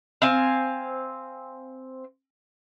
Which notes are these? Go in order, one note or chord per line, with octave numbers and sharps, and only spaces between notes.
C4 F5 G#5